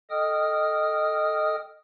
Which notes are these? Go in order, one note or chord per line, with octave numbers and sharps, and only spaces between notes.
A4 D#5 G5 D#6 F6